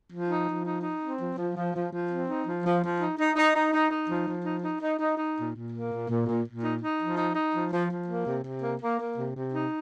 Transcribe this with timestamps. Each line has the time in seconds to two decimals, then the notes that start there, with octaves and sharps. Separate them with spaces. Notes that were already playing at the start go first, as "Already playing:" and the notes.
0.10 F3
0.29 D#4
0.46 F3
0.65 D#4
0.82 D#4
1.00 C4
1.18 F3
1.36 F3
1.55 F3
1.73 F3
1.91 F3
2.10 C4
2.28 D#4
2.45 F3
2.64 F3
2.83 F3
3.00 D#4
3.18 D#4
3.36 D#4
3.54 D#4
3.73 D#4
3.91 D#4
4.09 F3
4.27 F3
4.45 D#4
4.63 D#4
4.81 D#4
5.00 D#4
5.18 D#4
5.37 A#2
5.55 A#2
5.73 A#3
5.90 A#2
6.09 A#2
6.27 A#2
6.45 A#2
6.63 D#4
6.81 D#4
6.99 F3
7.17 D#4
7.35 D#4
7.53 F3
7.72 F3
7.90 F3
8.08 A#3
8.26 C3
8.44 C3
8.63 A#3
8.80 A#3
8.99 A#3
9.17 C3
9.35 C3
9.53 D#4